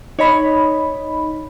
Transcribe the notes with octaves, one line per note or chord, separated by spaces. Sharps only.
D#4 C#5 D#5 B5